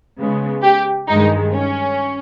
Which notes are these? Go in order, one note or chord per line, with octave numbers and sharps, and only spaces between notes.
C#3 G#3 B3
G4
G2 D#3 G#3 D#4
C#4